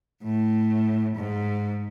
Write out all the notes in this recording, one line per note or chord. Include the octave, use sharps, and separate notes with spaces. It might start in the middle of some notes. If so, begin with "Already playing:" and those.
A2
G#2